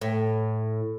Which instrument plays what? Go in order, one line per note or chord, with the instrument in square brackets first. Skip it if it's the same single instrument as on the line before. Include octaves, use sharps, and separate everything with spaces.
[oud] A2